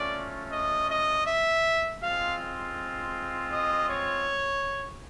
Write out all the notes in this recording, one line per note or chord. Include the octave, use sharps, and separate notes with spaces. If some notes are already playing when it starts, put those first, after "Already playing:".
Already playing: A3 C#4 F4 D5
D#5
D#5
E5
G#3 C4 F4 F5
D#5
C#5